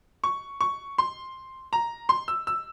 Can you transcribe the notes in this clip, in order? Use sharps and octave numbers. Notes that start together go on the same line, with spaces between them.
C#6
C#6
C6
A#5
C6
E6
E6